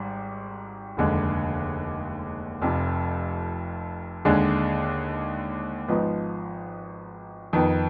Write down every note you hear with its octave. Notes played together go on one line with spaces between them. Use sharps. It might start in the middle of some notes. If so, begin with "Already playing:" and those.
Already playing: G#1 G#2 G3
F1 D#2 D3 G#3
F1 F2 C3
D#2 D3 G#3 D4 G#4
G#1 G#2 F3 B3 D#4
F2 D#3 B3